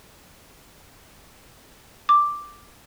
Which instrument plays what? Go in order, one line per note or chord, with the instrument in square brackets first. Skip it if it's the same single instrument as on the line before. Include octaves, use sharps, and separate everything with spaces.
[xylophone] D6